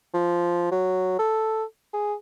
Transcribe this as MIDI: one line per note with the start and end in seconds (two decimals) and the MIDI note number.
0.14 0.69 53
0.71 1.17 54
1.19 1.64 69
1.93 2.14 68